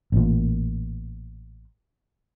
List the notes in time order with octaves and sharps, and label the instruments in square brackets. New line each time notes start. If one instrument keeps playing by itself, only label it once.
[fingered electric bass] A1 A#2